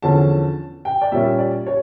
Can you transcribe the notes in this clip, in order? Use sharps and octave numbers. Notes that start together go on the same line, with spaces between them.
E2 D3 F3 C#4 A5
G5
D5
A#2 G3 A#3 C#4 E5
D5
C#5